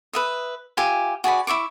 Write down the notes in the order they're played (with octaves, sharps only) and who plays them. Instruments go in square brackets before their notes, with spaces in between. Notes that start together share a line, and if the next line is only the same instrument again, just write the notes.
[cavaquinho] B4 E5 D#6
F4 G4 E5 G#5
F#4 G#4 D5 B5
E4 E5 C#6 D6